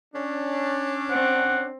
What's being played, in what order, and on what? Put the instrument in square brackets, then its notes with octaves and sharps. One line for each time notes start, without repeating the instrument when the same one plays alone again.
[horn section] C#4 D4
[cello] C4 [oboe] F#5